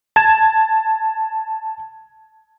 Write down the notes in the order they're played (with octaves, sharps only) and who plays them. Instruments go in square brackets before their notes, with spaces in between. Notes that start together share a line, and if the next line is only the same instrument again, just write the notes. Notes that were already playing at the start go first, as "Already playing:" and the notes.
[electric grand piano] A5 G#6 E7